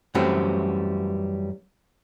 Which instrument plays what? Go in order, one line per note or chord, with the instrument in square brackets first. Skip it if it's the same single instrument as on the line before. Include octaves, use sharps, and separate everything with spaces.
[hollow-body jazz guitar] F#2 E3 F#3 G3 A3 C4